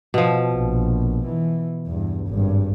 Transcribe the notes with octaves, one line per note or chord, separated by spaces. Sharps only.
B2 F3
A#1
E3
E2 G2
G#1 G2